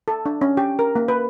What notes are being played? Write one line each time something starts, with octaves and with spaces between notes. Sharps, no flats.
A4
D4
C#4
G4
A#4
A#3
B4